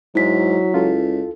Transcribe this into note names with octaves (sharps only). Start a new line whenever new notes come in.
G#2 F#3 E4 B6
C#2 F4 A4